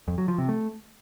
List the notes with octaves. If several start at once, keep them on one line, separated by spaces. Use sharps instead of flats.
F2
F#3
F3
C3
A3